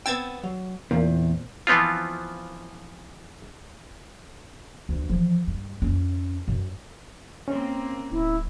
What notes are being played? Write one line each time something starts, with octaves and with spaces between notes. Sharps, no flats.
B3 C4 G5 E6 G#6 A6
F#3
E2 A#2 C4
E3 F3 B3 C4 F4
D2
E3 F3
G2
F2 C#4
F#2
A#3 C4 C#4
D1 E4